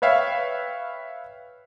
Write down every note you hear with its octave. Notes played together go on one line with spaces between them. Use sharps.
B4 C#5 E5 F5 G5 F6